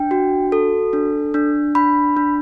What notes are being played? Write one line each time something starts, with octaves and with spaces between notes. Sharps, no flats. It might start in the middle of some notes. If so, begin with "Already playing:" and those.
Already playing: D4 G5
F#4
A4
D4
D4
D4 B5
D4